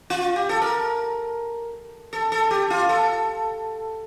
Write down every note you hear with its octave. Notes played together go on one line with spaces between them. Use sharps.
F4
G4
A4
A#4
A4
A4
G4
F4
A4